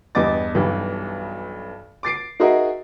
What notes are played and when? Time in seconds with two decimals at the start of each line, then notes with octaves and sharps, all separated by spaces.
0.15 E2 G2 G3 D#5 D6 A6
0.55 B1 G2 E3 G3
2.03 D6 A6 C7 D7
2.40 D#4 F#4 G#4 A#4 D#5 E5